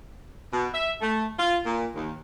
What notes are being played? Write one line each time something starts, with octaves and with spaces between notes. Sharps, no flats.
B2
E5
A3
F4
A#2
D#2